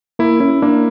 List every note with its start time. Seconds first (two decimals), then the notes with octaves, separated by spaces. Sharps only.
0.19 A#3 E4
0.40 C#4 E4
0.62 A#3 D4